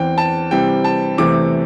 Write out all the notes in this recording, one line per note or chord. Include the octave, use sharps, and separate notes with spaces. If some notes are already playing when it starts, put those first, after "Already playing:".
Already playing: E2 E3 C4 G5
A5
C3 E3 G3 C4 G5
A5
E2 C3 E3 A3 C4 D6